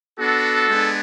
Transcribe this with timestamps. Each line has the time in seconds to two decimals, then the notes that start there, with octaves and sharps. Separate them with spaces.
0.19 B3 D4 F#4 A4
0.68 G#3 B3 D4